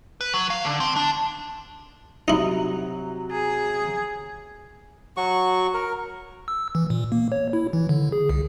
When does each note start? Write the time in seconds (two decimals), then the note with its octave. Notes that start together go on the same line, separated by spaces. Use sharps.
0.21 B4
0.34 F#3
0.50 F5
0.65 D3
0.80 C4
0.96 D4
2.28 C3 F#3 D#4 E4
3.31 G#4
5.17 F#3 F#4 C#6
5.74 A#4
6.48 E6
6.75 E3
6.90 A#2
7.12 A#3
7.32 C#5
7.53 E4
7.73 E3
7.89 D3
8.12 G#4
8.29 C2